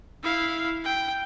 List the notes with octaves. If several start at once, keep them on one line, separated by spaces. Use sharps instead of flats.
E4 F5
G5